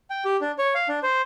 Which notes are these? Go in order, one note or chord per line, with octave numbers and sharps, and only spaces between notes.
G5
G4
D4
C#5
F5
D4
C5